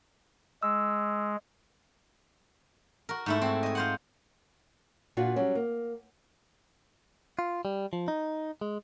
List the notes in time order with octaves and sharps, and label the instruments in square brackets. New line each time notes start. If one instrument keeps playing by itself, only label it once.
[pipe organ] G#3 [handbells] E6
[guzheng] F#4 A#4
G#2 A3 E4
C4 F#4
D#5 G#5
F4 C5 F#5
[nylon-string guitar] A#2 D4 F4 F#4
F#3 G3 C#4
A#3
[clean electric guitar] F4
G3
F3
D#4
G#3